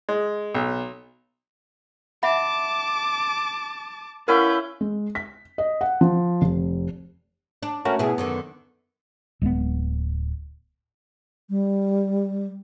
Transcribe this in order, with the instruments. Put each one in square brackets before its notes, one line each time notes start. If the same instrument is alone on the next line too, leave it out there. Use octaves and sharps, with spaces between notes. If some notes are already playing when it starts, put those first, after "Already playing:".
[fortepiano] G#3
B1
[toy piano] E5 F#5 B5 [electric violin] A5 D6
[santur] C#4 E4 F5 [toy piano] A#4 F#5 [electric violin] B4 G6
[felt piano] G#3
B6
D#5
F#5
F3
F1
[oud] D4
[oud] A3 [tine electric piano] C#4 F#4 A#4
[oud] B2 E4 G#4 [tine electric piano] B3
[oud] F#2 D3 D#3
[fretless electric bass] D1 G#3 A3 B3
[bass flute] G3